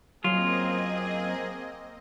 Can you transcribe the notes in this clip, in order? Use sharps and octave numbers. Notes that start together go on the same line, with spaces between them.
F#2 F#3 A#3 C4 F4 G#4 D#5